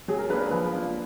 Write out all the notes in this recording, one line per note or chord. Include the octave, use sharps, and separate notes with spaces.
F#3 G#4
A#4
A#3 D4 B4
B4
F3 B4
A#3 D4 F4